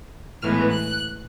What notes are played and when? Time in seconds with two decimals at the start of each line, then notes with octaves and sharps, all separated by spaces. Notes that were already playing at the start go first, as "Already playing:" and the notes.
0.42 A2 E3 G#3 B3 F6
0.70 F#6